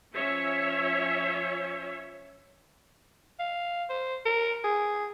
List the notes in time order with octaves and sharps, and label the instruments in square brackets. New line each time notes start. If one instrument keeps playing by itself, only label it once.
[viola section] F3 C#4 C#5 E5
[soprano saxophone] F5
C5
A#4
G#4